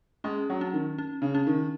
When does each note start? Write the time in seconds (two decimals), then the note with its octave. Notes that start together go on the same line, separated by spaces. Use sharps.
0.24 G#3 C#4
0.50 F#3
0.61 C#4
0.73 D#3
0.98 C#4
1.22 C#3
1.35 C#4
1.47 D#3